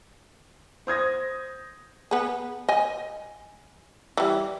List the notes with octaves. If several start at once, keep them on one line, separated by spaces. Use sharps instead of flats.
C5 D#6 G#6 A#6
B3 G#4
D#5 G#5
E3 G3